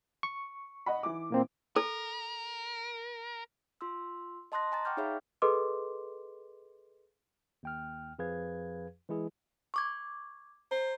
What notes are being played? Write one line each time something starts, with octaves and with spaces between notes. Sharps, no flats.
C#6
D#5 F#5 B5
E3 D6
A#2 A#3 C4
A4 A#4
F4 C6 E6
D#5 A5 C6 D#6 F#6 A#6
G#5 A#5 A6
F#5 G5 C#6 D6 F6 G6
D#4 G#4 C#5 E5 F5 B5
G#4 A4 B4 D#5 C6 D6
D#2 G5 F6
F2 F3 G#4 B4 F5 G#6
E3 G#3 E4 G#4
C#6 D6 G#6
C5 A#5